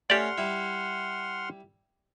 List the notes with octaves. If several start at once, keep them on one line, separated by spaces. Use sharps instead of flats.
A3 C#4 G4 D5 F#5 C6 F6
G3 E4